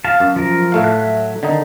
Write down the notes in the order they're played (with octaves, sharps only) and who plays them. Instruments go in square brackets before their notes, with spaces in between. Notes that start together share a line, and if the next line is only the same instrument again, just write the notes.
[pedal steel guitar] F5 A5
[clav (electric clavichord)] F#2
[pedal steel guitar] F3 A#4
[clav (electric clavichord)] A2 A3 F5
[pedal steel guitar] F#3 E5 F#6
[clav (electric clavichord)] D3 D#3 D#4